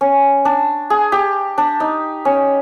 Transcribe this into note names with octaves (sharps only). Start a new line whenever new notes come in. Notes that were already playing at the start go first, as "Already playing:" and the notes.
C#4
D4
G#4
G4
D4
D#4
C#4